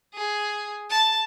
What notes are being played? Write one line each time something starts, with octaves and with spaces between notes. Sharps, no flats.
G#4
A5